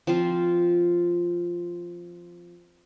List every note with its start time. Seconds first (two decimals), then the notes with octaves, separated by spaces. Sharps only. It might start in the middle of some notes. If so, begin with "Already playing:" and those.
0.07 F3 C4 F4